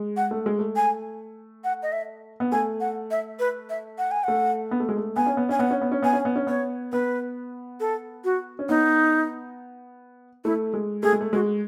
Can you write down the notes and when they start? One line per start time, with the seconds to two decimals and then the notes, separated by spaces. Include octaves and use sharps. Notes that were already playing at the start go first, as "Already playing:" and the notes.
Already playing: G#3
0.17 F#5
0.31 A3
0.46 G#3
0.59 A3
0.76 G#5
1.64 F#5
1.83 D#5
1.92 E5
2.40 B3
2.52 A3 G#5
2.81 F#5
3.11 E5
3.39 B4
3.70 E5
3.98 F#5
4.11 G#5
4.24 A3 F#5
4.71 B3
4.80 A3
4.89 G#3
4.96 A3
5.16 B3 G#5
5.26 C#4
5.37 B3
5.49 C#4 G#5
5.59 B3 F#5
5.71 C#4
5.82 B3
5.92 C#4
6.03 B3 G#5
6.13 C#4
6.25 B3
6.36 C#4
6.47 B3 C#5
6.92 B3 B4
7.80 A4
8.24 F#4
8.59 C#4
8.69 B3 D#4
10.45 A3 E4
10.74 G#3
11.03 A3 G#4
11.13 G#3
11.21 A3
11.33 G#3 F#4